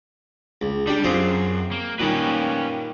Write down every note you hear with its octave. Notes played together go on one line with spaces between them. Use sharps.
C#2
G3 D4 G4
F#2 C4 F4 G#4
A#3
A#2 D#3 G3 C#4 B4